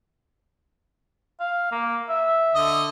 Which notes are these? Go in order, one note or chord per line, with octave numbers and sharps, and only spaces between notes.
F5
A#3
E5
D3 D#5